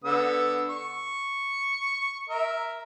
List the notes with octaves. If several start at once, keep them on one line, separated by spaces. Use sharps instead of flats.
D3 B3 E6
C#6
A#4 E5